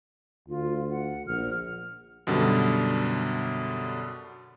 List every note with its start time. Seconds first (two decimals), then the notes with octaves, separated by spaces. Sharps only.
0.49 D2 F4
0.91 F#5
1.27 A#1 F6
2.27 F#2 B2 D3 G3